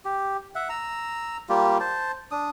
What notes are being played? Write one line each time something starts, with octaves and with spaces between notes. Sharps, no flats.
G4
E5 F#5
A#5 E6
G3 A#3 F4 G4
C5 A5
D4 D#6